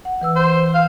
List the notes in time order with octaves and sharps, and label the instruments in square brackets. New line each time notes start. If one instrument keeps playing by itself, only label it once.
[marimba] F#5
E3 B4 E6
[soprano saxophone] C5
F5